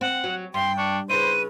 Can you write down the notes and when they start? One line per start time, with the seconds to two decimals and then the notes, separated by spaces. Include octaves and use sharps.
0.01 C4 F#5
0.24 F#3
0.54 G2 G5 C6
0.77 D4 C#6
1.10 C#3 E4 B4 C5 D#7